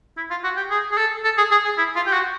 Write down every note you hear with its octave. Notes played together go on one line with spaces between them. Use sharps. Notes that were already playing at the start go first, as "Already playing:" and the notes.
E4
F4
F#4
G4
G#4
G#4
A4
A4
G#4
G#4
G#4
E4
F4
G4
F#4